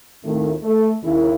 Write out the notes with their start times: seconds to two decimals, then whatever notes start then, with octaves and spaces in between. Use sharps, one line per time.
0.24 D#2 A2 D#3 A3 C4 F4
0.63 A3
1.03 D#2 C#3 E4